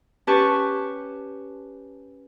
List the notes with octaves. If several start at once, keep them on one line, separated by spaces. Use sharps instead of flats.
C#4 G4 B4 A5 C#6